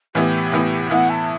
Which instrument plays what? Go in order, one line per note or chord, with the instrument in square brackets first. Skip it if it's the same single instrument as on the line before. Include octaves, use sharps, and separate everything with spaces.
[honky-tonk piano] A2 E3 B3 E4 [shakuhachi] G4
[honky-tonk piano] A2 E3 B3 E4
[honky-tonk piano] A2 E3 B3 E4 [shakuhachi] F#5
[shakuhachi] A5